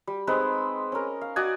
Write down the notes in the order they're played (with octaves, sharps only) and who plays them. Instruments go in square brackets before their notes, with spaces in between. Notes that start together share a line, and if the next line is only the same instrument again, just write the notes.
[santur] G3
G#3 C4 D#4 B4
C#4 A#4
F5
F#4 D5 D#5 G#5